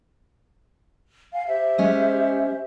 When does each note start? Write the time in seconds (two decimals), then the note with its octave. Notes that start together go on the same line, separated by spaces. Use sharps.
1.33 F5 F#5 G#5
1.47 G4 C5 E5
1.78 G#3 C#4 D#5